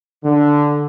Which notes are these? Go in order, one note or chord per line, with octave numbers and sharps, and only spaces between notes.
D3